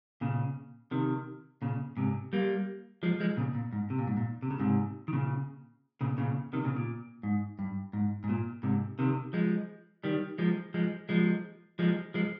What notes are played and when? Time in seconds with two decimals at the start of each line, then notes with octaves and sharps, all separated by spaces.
0.21 A#2 C#3
0.91 C3 D#3
1.62 A#2 C#3
1.97 G#2 C3
2.33 G3 A#3
3.03 F3 G#3
3.20 F3 G#3
3.37 A#2 C#3
3.55 A#2
3.73 G#2
3.90 C3
3.99 A#2
4.08 G#2
4.17 A#2
4.42 C3
4.51 C#3
4.60 G#2 C3
5.08 D#3
5.13 A#2 C#3
6.01 A#2 C#3
6.18 A#2 C#3
6.53 C3 D#3
6.65 A#2 C#3
6.77 A#2
7.23 G#2
7.59 G2
7.93 G#2
8.24 G#2
8.29 A#2
8.63 G#2 C3
8.99 C3 D#3
9.33 F3 G#3
10.04 D#3 G3
10.38 F3 G#3
10.74 F3 G#3
11.09 F3 G#3
11.79 F3 G#3
12.14 F3 G#3